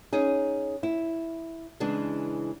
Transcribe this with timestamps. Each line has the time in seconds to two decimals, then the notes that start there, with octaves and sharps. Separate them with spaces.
0.13 C#4 D#4 G#4
0.83 E4
1.80 C#3 E3 G#3 D4